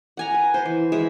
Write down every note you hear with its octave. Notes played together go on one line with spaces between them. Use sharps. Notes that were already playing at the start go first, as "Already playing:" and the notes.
F#5 G#5 A#5
B4
C5
E3
G#3 E5